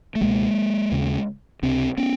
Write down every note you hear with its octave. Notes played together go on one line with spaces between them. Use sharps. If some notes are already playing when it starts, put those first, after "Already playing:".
A3
C#2 B2 G#3 A#3
D#2 C#3
C#2 C3 C4 D4
B3 C#4